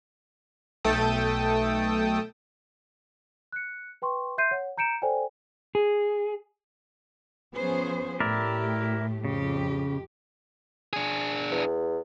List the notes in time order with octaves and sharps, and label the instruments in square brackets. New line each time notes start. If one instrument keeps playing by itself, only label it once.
[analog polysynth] B1 A3 A4 G5 A5 D#6
[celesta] F#6 C#7
B4 G5 C6 C#6
E5 C6 G6 C7 D#7
C#5 F#5
A#5 G6 C#7 D7 E7
A4 C5 D5 G5 G#5
[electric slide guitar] G#4
[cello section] F3 G#4 C5 [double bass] B3 C#4
[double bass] A2 [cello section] A3 G4 [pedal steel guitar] E4 A#4 D5
[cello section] F2 G4 [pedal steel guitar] C#3
[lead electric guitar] D4 G#4
[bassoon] E2